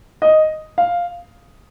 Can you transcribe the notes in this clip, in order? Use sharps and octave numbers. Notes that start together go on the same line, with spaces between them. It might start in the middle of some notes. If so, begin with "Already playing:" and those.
D#5
F5